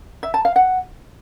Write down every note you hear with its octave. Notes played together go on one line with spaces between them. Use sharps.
E5
A5
F5
F#5